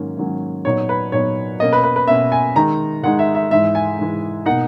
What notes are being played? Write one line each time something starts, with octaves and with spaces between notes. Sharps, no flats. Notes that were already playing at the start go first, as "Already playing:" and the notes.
Already playing: G#2 D#3 F#3 A#3 C#4
G#2 D#3 F#3 A#3 C#4
A#2 F#3 B3 D#4 C#5
B4
A#2 F#3 B3 D#4 C#5
B2 A#3 C#4 D#5
B4
B4
B4
B2 A#3 C#4 E5
G#5
D#3 G#3 D#4 A#5
D#3 G#3 D#4 F#5
E5
E5
G#2 E3 G#3 E5
G#5
G#2 E3 G#3
B2 A#3 D#4 F#5